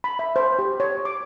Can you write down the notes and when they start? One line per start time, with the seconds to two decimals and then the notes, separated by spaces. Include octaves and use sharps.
0.04 B5
0.19 E5
0.36 C5
0.59 G4
0.80 C#5
1.05 D6